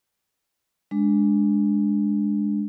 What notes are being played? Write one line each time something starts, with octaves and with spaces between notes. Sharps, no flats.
G#3 D4